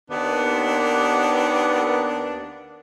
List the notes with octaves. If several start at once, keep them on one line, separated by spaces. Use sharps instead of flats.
D#2 B3 D4